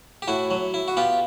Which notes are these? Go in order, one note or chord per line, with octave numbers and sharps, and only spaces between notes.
G4
A2 E4 F#4
F#3
E4
F#4
B3 F4 G4